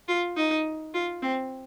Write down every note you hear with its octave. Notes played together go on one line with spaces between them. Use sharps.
F4
D#4
F4
C4